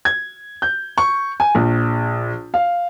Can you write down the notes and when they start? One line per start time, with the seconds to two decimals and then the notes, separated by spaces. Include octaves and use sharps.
0.05 G#6
0.62 G6
0.98 C#6
1.40 G#5
1.55 A#1
2.54 F5